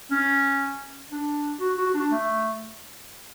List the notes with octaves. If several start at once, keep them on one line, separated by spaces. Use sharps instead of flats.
C#4
D4
F#4
F#4
D4
A3